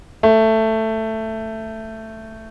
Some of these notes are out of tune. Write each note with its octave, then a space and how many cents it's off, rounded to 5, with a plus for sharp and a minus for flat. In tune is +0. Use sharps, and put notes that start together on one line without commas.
A3 +10